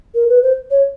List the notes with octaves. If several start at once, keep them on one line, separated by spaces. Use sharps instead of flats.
A#4
B4
C5
C#5